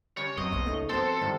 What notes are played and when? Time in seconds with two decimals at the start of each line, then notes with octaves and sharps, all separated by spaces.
0.17 C#3 G3 C#5
0.38 F#2 F#3 C4 C#5 D#5
0.52 B1 C#3 A#3 B3
0.66 C#2 A3 D#4
0.89 F2 B3 C4 F#4 A4 A#4 C5
1.22 A2 D#3 G3